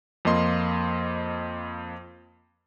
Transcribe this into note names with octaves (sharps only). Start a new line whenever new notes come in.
F2 A#3 D#5 C6